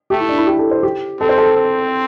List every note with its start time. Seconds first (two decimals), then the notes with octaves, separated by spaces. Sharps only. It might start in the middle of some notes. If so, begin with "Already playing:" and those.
0.10 A3 G4
0.20 E4
0.29 D4
0.38 E4
0.47 G4
0.59 A4
0.71 C5
0.83 G4
1.21 C4 A4
1.29 C5
1.38 A4
1.56 C4